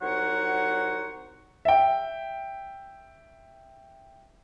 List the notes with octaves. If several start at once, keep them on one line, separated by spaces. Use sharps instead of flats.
C2 F#3 D#4 C5 C#5 F#5
E5 G5